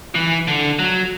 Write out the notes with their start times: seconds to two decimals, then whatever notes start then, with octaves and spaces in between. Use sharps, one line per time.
0.15 E3
0.48 D3
0.79 F#3